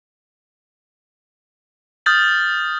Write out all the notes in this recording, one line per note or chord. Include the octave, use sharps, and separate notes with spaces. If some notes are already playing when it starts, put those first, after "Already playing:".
D#6 F6 G6 A6 F#7